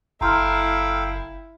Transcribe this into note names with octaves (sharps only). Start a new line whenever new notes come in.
F#1 E4 A4 F5 G5 A#5 C6 F6